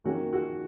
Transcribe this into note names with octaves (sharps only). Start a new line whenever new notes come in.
D#3 A#3 C#4 F#4
F#4